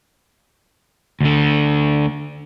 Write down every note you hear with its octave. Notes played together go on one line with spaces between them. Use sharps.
D2 D3